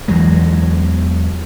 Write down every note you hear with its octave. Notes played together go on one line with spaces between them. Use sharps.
E2 E3 F#3 G#3